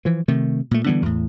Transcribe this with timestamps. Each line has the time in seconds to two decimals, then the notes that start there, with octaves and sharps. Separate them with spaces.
0.05 E3 F3
0.28 C3 D#3 A3
0.71 A#2 A3
0.86 D3 E3 G3 B3
1.02 E2 A2